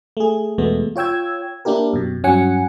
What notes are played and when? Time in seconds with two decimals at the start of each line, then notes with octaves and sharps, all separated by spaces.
0.17 A3 G#4
0.58 E2 B2 G#3 A3 B3
0.96 F4 C#5 G5 E6 G#6
1.65 A#3 D4 E4 G4 A#4
1.93 F#2 B2
2.24 G2 F#3 C#4 F#5 G#5 C#7